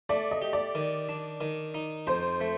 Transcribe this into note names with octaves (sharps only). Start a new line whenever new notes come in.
A3 D5
D#5
G4
D5
D#3
D4
D#3
D#4
F2 C5
A3